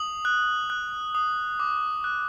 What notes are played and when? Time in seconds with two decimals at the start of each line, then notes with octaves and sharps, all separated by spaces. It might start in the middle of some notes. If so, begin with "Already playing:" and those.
Already playing: D#6 F#7
0.25 F#6
0.70 F#6
1.15 D#6
1.60 D6
2.04 F#6